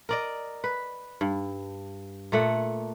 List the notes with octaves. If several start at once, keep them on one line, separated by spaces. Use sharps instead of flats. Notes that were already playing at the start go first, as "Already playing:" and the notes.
A#4 D5 D#5
B4
G2
A#2 A3 F#5